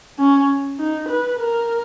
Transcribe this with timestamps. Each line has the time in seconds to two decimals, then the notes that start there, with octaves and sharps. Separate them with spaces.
0.19 C#4
0.79 D#4
1.09 B4
1.39 A#4